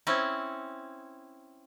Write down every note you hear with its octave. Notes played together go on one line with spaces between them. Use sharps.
C4 C#4 E4